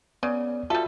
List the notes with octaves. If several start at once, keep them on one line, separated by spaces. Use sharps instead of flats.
C#3 B3 D5
G3 F4 F#4 A4 E5